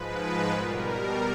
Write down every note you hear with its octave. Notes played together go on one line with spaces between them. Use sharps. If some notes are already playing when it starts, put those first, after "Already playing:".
Already playing: G#2 F3 G#3 B4
B2 G3 A#4